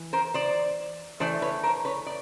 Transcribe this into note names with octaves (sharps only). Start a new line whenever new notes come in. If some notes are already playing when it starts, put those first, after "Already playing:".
Already playing: E3
A#4 C5
C5 D5
E3 A3 D4 C5 D5
B4 C#5
A#4 C5
B4 C#5
D5